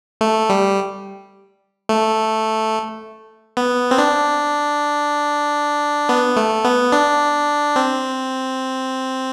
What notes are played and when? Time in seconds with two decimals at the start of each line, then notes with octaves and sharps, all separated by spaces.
0.21 A3
0.50 G3
1.89 A3
3.57 B3
3.91 C4
3.98 D4
6.09 B3
6.36 A3
6.65 B3
6.92 D4
7.76 C4